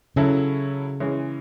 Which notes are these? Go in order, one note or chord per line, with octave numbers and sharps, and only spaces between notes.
C#3 F#3 C#4 E4 A4
E3 G#3 C#4